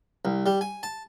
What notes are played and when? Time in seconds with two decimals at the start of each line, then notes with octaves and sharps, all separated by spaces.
0.25 C2
0.46 G3
0.61 G#5
0.83 A5